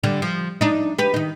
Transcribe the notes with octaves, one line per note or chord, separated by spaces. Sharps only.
D3 G3
F3
D4 D#4
G4 B4
D#3 D#4